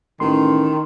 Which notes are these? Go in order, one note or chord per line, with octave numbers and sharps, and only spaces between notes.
A1 D#3 C6